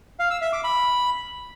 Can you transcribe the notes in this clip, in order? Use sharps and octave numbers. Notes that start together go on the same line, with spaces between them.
F5
E6
E5
D6
B5